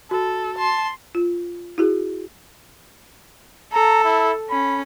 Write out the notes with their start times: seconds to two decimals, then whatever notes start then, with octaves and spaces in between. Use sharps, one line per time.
0.11 F#4 A4
0.58 A5 C6
1.15 F4
1.78 E4 F#4 G#4
3.73 A4 A#5
4.04 E4
4.50 C#4 B5